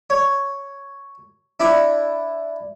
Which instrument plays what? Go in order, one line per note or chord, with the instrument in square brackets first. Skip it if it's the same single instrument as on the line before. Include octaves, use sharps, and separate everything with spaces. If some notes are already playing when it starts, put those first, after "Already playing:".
[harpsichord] C#5
D4 E4 D5